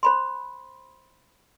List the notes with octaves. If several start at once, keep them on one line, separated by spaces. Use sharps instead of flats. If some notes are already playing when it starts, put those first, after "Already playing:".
C5 B5 C6